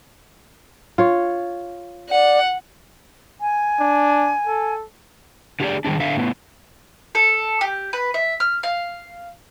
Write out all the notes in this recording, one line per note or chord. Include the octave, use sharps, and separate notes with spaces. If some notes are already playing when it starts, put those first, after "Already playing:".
F4 C#5
D5 F#5
G#5
D4
A4
D3 G4 G#4 D5
D#3 G3 G#3 D4
D3 E5 F5
A2 B3
A4
G4
B4
E5
F6
F5